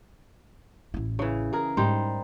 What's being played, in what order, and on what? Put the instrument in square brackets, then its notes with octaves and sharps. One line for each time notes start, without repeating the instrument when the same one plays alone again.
[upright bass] A1 E4
[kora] C#3 E3
G#4 A#4
[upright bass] G#2 [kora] G3 D#4 C5